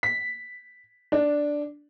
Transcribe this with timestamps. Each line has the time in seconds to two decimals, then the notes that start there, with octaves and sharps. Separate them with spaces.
0.03 B6
1.12 D4